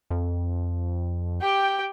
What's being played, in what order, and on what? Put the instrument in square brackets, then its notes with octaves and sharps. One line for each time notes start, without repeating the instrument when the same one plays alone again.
[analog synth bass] F2
[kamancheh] G4 G5